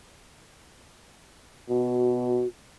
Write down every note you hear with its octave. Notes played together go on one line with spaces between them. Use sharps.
B2 F#4